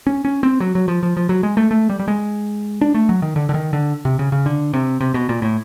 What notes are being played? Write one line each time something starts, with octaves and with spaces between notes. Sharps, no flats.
C#4
C#4
C4
F#3
F#3
F3
F3
F3
F#3
G#3
A3
A3
G3
G3
G#3
D4
A3
F#3
D#3
D3
D3
D#3
D3
C3
C#3
C#3
D3
C3
C3
B2
A#2
A2